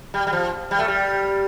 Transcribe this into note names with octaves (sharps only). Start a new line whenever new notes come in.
G3
G3
F3
G3
A3
G3